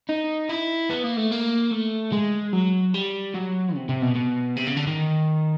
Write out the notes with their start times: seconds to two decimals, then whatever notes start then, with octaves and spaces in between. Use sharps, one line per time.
0.09 D#4
0.49 E4
0.90 B3
1.04 A#3
1.18 A3
1.32 A#3
1.72 A3
2.12 G#3
2.53 F#3
2.94 G3
3.34 F#3
3.75 C3
3.89 C3
4.02 B2
4.15 B2
4.57 C3
4.67 C#3
4.76 D3
4.87 D#3